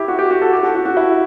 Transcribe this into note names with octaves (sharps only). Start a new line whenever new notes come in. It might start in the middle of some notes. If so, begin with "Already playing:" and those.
Already playing: E4 G4
F#4
G4
F#4
A4
G4
F#4
F#4
F#4
E4